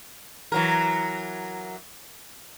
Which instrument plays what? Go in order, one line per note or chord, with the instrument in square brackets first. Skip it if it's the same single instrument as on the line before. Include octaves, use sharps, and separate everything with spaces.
[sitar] E3 F#3 A#4